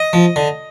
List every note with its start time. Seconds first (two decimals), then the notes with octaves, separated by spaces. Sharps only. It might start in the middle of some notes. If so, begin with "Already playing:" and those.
Already playing: D#5
0.13 F3
0.36 D3